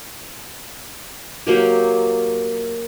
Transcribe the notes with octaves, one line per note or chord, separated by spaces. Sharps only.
F#3 A#3 G4